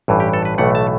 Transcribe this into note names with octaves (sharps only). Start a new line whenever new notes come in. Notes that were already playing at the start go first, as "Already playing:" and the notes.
A1 G2 E3
G4
A4
B4
B1 A2 E3 A3 F#5
A5